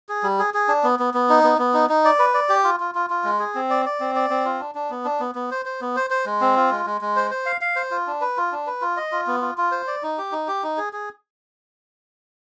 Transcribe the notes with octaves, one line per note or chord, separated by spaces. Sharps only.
G#4
G3
G#4
G#4
D4
B3
B3
B3
D#4
B3
B3
D#4
D#4
D5
B4
D5
G4
F4
F4
F4
F4
G#3
G#4
C4
D5
D5
C4
D5
C4
F4
D4
D4
B3
D4
B3
B3
C5
C5
B3
C5
C5
G#3
C4
F4
G#3
G#3
G#3
C5
C5
F5
F5
C5
F4
D4
B4
F4
D4
B4
F4
D#5
F4
B3
F4
F4
C5
D5
D#4
G4
D#4
G4
D#4
G#4
G#4